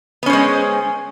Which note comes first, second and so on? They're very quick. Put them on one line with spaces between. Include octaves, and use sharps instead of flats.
B3 C#4 C5 G#3